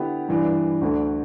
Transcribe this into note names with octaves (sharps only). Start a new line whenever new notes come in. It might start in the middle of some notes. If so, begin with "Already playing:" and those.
Already playing: D3 B3 E4 G4
G2 E3 G3 D4
D2 D3 A3 D4